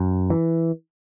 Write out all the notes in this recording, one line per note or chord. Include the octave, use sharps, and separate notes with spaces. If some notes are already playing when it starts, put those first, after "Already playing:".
Already playing: F#2
E3